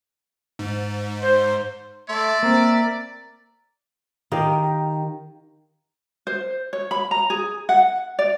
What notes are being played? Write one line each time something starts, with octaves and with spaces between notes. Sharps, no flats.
G#2
C5
A3 D5 E5 C6
A#3 C4 A#4
D#3 G4 F5
C5
C#5
B5
A#5
G#4
F#5
D5